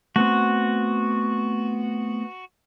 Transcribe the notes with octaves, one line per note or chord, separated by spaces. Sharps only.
A3 B3 C4 F#4